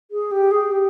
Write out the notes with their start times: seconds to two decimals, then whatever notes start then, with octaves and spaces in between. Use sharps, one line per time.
0.11 G#4
0.31 G4
0.51 G#4
0.71 G4